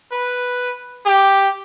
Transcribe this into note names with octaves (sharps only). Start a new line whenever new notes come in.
B4
G4